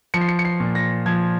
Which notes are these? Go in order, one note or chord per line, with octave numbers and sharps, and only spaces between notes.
F3 C#7
C7
C#7
C#7
C7
A#2
A#6
F3 G#6